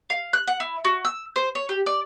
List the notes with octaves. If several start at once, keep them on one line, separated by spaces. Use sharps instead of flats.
F5
F#6
F#5
E4
F#4
E6
C5
C#5
G4
D5